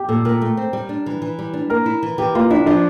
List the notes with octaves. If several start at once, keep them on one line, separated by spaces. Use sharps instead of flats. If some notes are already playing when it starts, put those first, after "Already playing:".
Already playing: G4
A#2 A4
A#2 A#4
A3
C4
G3
D4
E3
E3
G3
D4
A#3 A#4
E4
E3
E3 G4
A#3 F4
D4 E4
F3 D4